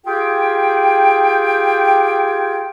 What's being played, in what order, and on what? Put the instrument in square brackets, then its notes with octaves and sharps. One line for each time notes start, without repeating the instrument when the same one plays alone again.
[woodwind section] F4 G4 G#4 G5